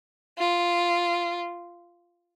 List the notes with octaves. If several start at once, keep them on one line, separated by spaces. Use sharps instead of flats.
F4